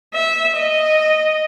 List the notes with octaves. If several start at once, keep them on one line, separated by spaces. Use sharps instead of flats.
E5
D#5